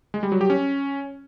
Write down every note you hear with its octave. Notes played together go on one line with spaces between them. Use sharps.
G#3
G3
F#3
G4
C#4